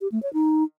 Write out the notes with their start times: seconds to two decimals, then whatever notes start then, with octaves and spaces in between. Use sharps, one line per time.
0.01 G4
0.12 A3
0.23 C#5
0.33 D#4